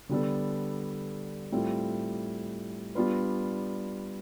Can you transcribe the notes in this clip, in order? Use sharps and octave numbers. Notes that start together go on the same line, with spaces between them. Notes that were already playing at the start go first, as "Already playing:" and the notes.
D3 G3 B3 D4 A4
A2 G3 C4 F4 A4
G3 B3 D4 F4 B4